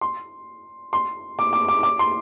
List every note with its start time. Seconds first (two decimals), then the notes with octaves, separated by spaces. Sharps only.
0.01 C6
0.93 C6
1.39 D6
1.53 D6
1.68 D6
1.83 D6
1.99 C6